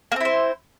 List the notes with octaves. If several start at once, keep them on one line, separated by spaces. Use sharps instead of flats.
A#3 C4 E4 C5